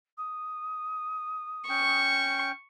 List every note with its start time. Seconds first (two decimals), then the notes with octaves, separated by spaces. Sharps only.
0.17 D#6
1.69 C#4 G5 C#6